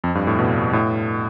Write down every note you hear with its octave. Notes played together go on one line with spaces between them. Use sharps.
F2
G2
A2
B2
A2